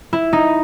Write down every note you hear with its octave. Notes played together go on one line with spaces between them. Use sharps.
E4
D#4